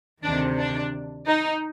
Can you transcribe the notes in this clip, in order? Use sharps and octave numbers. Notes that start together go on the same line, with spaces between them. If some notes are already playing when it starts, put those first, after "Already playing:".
D2 C3 D#3 D4
D4
D#4